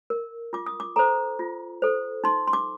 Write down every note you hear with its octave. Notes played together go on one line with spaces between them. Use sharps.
A#4
F4 D6
D#6
D6
A4 C5 A#5
F4
A4 C5
D#4 C6
C6
D6